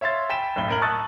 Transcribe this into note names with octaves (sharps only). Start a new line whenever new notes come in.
C#5 E5 F5 C6 A6
G5 G#5 B5 B6 E7
B1 A2 G7
A2 A#4 F#7
A5 C#6 D#6 E6 F#6 A6